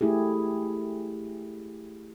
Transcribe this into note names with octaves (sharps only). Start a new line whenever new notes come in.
A3 E4 G4 G#4